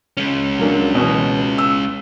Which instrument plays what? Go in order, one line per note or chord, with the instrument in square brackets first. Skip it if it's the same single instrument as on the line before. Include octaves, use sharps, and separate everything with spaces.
[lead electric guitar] G#3 C#4
[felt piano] F#3 A#3 D4
B2 E3
E6